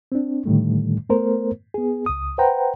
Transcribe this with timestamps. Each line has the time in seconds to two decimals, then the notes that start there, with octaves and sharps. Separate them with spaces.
0.12 C4 D4
0.45 A2 D3 D#3 G3 A3
1.10 A3 B3 A#4 C5
1.74 B3 G#4
2.06 C#2 D#6
2.38 B4 C5 F#5 G5 A#5